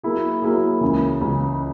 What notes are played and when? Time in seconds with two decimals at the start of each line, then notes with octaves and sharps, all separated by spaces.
0.03 F#3 A#3 E4 G#4
0.42 F#3 A#3 E4 G#4
0.81 C#2 C#3 E3
1.21 C#2 C#3 E3